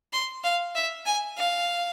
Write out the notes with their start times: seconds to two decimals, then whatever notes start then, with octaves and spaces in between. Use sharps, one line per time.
0.13 C6
0.43 F5
0.75 E5
1.06 G#5
1.37 F5